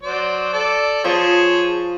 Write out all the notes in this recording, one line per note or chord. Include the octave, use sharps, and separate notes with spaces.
F#3 C5 D5
A4 D5
F3 G#4 C5 C#5 A5 D#6